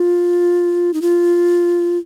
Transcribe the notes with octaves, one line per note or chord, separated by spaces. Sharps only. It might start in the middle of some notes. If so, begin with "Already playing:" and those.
Already playing: F4
D#4
F4